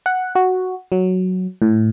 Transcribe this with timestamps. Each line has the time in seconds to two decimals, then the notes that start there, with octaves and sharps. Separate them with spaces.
0.06 F#5
0.35 F#4
0.92 F#3
1.62 A2